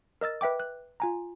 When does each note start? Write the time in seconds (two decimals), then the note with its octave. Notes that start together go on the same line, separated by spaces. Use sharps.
0.21 A#4 D#5 E6 A6
0.41 B4 E5 G5 D6
0.60 F#6
1.00 F4 G#5 A#5